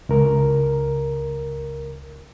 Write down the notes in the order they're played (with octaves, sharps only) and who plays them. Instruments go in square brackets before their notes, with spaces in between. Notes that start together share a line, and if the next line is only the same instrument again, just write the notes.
[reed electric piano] C#2 A#4